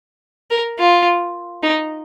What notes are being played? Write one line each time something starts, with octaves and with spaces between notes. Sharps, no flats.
A#4
F4
D#4